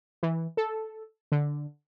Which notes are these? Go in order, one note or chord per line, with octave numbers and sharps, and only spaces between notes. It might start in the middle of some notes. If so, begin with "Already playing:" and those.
E3
A4
D3